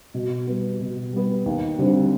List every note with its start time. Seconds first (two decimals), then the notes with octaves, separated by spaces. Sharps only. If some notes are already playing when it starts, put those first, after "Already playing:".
0.14 B2
0.47 G3 B3
0.80 B2
1.13 G3 B3
1.46 D#2
1.79 D3 G3 C4